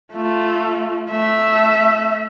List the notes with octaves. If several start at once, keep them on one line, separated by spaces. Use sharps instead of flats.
A3 F4
A3 E5